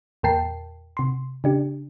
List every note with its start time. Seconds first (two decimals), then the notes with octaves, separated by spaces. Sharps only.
0.23 E2 A#2 A#4 G5 A5 C7
0.97 C3 C6
1.44 C#3 D4 G4